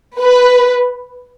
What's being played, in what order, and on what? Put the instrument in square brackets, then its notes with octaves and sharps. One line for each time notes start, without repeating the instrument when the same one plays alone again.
[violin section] B4